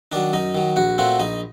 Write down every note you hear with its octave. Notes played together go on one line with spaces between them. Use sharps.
D#3 F#3 D4 D5
F#2 D#4 D#5
D#3 F#3
A#1 F#4 F#5
A#2 A3 C4 F#4 F#5
A#1 D#4 D#5